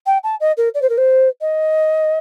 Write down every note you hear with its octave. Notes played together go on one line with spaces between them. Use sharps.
G5
A5
D#5
A#4
D5
C5
A#4
C5
D#5